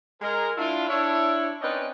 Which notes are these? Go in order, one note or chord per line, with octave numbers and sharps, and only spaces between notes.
G#3 A#4
D4 E4 F4
D4 E4 C#5
C4 C#4 D#4 B4 D5 D#5